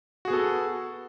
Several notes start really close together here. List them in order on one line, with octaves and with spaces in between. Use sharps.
F#4 G#4 B3 A4